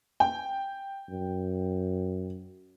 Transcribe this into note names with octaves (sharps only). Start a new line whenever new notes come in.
G5
F#2